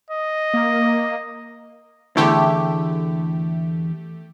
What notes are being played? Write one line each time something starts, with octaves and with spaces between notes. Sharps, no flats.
D#5
A#3
E2 D3 A3 E4 G4